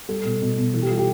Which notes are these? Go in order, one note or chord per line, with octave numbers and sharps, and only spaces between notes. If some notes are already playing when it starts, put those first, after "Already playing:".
G3 A4
B2
B2
B2
E3 A4
G4
G3 F4
G4